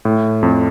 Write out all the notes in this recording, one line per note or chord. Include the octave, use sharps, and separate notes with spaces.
A2
F2